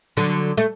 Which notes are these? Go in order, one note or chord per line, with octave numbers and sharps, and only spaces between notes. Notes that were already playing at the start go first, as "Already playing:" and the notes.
D3 F#3
A3